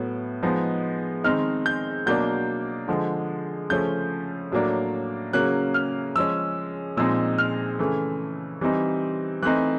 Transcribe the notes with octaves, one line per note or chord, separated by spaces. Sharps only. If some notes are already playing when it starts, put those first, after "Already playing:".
Already playing: A2 F#3 B3
F3 G#3 B3 D#4
D#3 G#3 C4 D#4 F6
G6
B2 F#3 A#3 D4 G6
D3 F3 G#3
C#3 F3 A3 C#4 G6
A2 F#3 A#3 D4
C#3 F#3 A#3 C#4 F#6
F6
F3 G#3 C#4 E6
A#2 F3 G#3 C4 D#4 E6
F6
C#3 E3 A3
E3 G3 C4 D#4
E3 A3 C4 D#4 F#6